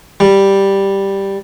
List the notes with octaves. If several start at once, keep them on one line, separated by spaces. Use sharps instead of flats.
G3